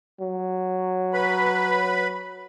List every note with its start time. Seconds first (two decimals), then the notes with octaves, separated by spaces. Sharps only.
0.20 F#3
1.13 B4 B5